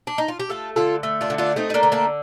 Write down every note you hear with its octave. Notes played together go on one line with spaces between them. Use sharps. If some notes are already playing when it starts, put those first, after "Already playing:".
D4
D#4
F4
G4
A3 F4 A4
D3 F4 A4
A3
D4 F4
D3
D4 F4
A3 C4 D#4
D#4
A#3 D4
D3
A#3 D4